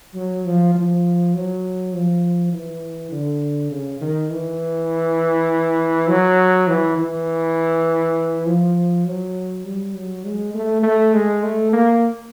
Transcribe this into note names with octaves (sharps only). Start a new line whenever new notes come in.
F#3
F3
F3
F#3
F3
E3
D3
C#3
D#3
E3
F#3
E3
E3
F3
F#3
G3
F#3
G#3
A3
A3
G#3
A3
A#3